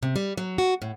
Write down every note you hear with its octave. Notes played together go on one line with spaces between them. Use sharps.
C3
G3
F#3
F#4
A2